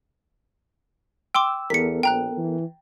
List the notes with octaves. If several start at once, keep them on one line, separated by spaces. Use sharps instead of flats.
G5 C6 D6 E6
E2 B3 A4 A#4 B6 C#7
A#1 G5 A#5 F#6
E3